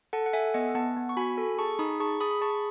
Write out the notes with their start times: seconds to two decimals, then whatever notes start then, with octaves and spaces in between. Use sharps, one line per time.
0.13 A4 F#5 A5
0.26 F#5
0.33 A4 E5 G#5
0.54 B3 D#5 F#5
0.75 B3 F#5 A5
0.97 B3
1.09 C#6
1.17 F#4 G#5 B5
1.38 A4
1.58 G#4 A5 C#6
1.79 D#4 B5 D#6
2.00 G#4 A5 C#6
2.20 G#4 B5 D#6
2.31 B5
2.41 G#4 A5 C#6